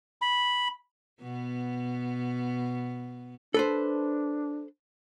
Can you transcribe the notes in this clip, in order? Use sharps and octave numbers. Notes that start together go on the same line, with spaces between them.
B5
B2 B3
D4 A4 B4 C5